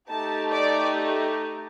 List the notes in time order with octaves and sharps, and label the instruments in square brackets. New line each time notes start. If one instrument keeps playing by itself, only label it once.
[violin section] A3 D#4 G4 A5
D5